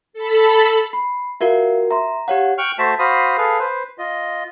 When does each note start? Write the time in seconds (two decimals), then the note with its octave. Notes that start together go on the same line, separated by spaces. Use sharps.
0.13 A4 B5
0.93 B5 C7
1.41 F4 F#4 A#4 E5 F5
1.91 E5 A#5 C6
2.28 G4 C#5 F5 F#5
2.58 G5 C#6 F6 F#6
2.78 A3 F#4 C5 E5 A5
2.99 F#4 C5 F5 B5 D#6
3.38 G#4 A4 B4 F5
3.59 B4 C5
3.98 F4 D#5